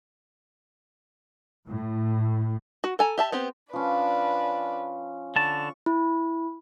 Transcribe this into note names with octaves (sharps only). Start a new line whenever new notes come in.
A2
F#4
A4 G#5 A#5
G4 E5 A5
B3 C4 G4
F3 C#4 D4 B4 D5
D3 A5 C#6
E4